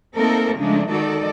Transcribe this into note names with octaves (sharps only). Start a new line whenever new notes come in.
A3 A#3 C4 D#4 A4 A#4
C#3 F3 G#3 A3 D4 D#4
D#3 G#3 D#4 F#4 A4 D5